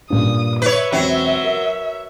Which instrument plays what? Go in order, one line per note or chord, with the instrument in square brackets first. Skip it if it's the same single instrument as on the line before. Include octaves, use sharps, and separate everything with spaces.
[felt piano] G2 A#2 [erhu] D#6
[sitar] B4 C#5 [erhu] E5
[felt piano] E1 C4 G5 [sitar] F#3
[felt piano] A#4